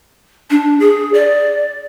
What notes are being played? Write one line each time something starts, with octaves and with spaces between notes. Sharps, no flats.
D4
G#4
D5